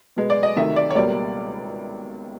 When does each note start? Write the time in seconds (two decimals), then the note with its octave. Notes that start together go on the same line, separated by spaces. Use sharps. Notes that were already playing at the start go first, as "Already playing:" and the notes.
0.16 B2 G#3 B3
0.30 D5
0.43 D#5
0.56 D2 C3 D#3 E5
0.76 D5
0.90 C#5
0.95 C#2 B2 G3 A#3 D5